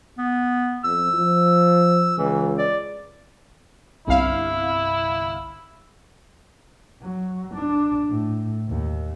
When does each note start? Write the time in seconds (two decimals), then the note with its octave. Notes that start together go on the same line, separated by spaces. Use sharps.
0.18 B3
0.84 F2 E6
1.13 F3
2.18 C#2 E3
2.58 D5
4.07 G1 C2 E4 F5
7.02 F#3
7.54 D4
8.10 A2
8.68 D#2